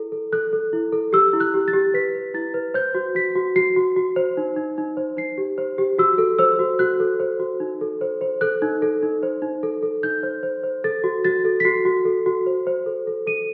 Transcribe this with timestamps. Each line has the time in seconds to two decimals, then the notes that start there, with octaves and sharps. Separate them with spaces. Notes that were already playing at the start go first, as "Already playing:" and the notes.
Already playing: E4 A4
0.12 A4
0.32 A4 F#6
0.53 A4
0.73 E4
0.93 A4
1.13 G4 E6
1.33 E4
1.40 F#6
1.54 G4
1.68 A6
1.73 G4
1.94 B4 B6
2.15 B4
2.34 E4 A6
2.54 B4
2.74 C5 G6
2.95 F#4
3.15 F#4 B6
3.35 F#4
3.56 F#4 C7
3.76 F#4
3.96 F#4
4.16 C5
4.37 D#4
4.57 D#4
4.78 D#4
4.97 C5
5.17 D#4 C7
5.38 G4
5.58 C5
5.78 G4
5.99 F#4 E6
6.18 A4
6.39 C5 E6
6.59 F#4
6.79 F#4 F#6
7.00 A4
7.20 C5
7.40 F#4
7.60 D#4
7.81 A4
8.01 C5
8.21 C5
8.41 A4 F#6
8.62 D#4
8.82 A4
9.03 D#4
9.23 C5
9.42 D#4
9.63 A4
9.83 A4
10.03 D#4 G6
10.23 C5
10.43 C5
10.63 C5
10.84 A4 A6
11.04 F#4
11.25 F#4 A6
11.45 A4
11.60 B6
11.65 F#4 C7
11.85 F#4
12.05 A4
12.26 F#4
12.46 C5
12.67 C5
12.86 A4
13.07 A4
13.27 A4 D#7